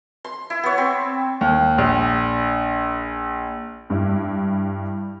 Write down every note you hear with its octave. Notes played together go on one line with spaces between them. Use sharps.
C6
E4
B3 C#5
C4
D#2
A#1
G2 E4